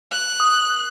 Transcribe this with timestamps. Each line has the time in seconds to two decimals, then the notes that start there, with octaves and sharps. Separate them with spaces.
0.12 F#6
0.40 D#6